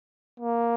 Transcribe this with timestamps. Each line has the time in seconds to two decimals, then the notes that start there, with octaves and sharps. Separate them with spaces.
0.40 A#3